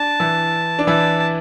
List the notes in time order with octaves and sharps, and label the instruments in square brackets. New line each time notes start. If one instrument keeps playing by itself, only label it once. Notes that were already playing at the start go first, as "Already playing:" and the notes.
Already playing: [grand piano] D4 [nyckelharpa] A5
[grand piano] E3 E4
D4
[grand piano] E3 E4 [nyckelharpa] A5